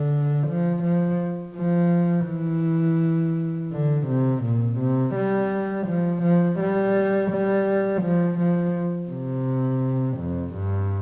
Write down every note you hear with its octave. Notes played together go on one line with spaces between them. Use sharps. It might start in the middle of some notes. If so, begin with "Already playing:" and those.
Already playing: D3
F3
F3
F3
E3
D3
C3
A#2
C3
G3
F3
F3
G3
G3
F3
F3
C3
F2
G2